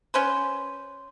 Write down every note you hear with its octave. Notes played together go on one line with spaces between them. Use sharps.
C#4 B4 C5